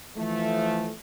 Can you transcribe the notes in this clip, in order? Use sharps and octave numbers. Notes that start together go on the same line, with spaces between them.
E3 F3 A3